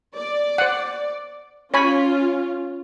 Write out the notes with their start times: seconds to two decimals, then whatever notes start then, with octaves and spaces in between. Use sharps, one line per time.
0.17 D5
0.58 C5 F#5
1.74 C#4 F4 C#5 G#5 B5